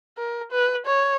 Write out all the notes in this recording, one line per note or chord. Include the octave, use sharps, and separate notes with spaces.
A#4
B4
C#5